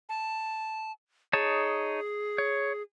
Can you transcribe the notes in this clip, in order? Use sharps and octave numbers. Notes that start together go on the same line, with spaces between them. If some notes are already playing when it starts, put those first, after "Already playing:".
A5
D#4 G#4 C#5 A5
C#5